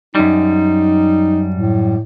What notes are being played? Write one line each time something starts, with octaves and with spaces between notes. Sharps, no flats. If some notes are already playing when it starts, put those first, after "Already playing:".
F#2 G3 D#4
A2